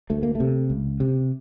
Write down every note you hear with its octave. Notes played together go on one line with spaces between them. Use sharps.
D2 A3
A#3
C3 A3
C#2
C3